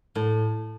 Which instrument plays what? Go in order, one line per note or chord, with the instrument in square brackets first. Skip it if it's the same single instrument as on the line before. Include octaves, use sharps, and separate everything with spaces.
[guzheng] A2